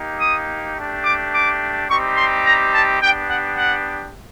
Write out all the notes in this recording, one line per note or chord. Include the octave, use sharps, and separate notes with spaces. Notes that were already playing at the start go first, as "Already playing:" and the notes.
Already playing: A#3 D#4 G4
D#6
A3 D4 G4
D6
D6
G3 C4 D#4 G4 C#6
C6
A#5
A5
B3 D4 G4 G5
F#5
F#5